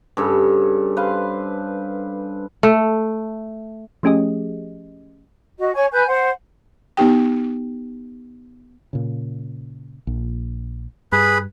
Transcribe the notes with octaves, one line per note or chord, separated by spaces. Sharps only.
G2 C#3 A4
B4 C5 F5
A3
F3 A3 C#4 G4 G#4 D#5
F#4 D#5
C#5 G#5 C#6 G#6
B4 G#5 G6
C5 F#5
B3 D#4 G4 G5
A#2 C#3
A#1
G2 G#4 B4 B5